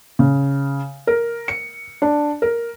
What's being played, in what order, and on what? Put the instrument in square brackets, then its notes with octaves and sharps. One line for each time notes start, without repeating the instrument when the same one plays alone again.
[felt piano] C#3
A#4
C#7
D4
A#4